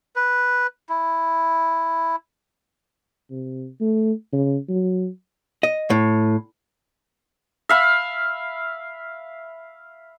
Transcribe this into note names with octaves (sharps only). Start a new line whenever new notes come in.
B4
E4
C3
A3
C#3
F#3
D#5
A2
E5 F5 B5